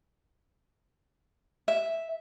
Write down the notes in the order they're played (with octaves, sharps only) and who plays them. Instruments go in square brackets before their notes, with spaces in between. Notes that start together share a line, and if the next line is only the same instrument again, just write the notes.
[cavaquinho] E5